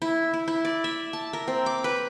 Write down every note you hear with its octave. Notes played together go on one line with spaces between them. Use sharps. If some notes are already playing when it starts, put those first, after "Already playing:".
E4
E4
E4
D5
E5
A5
A#4
C4
D6
B4